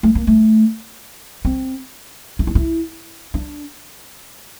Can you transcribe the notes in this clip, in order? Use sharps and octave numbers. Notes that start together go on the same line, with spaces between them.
A3
A#3
A3
C4
E4
D4
E4
D4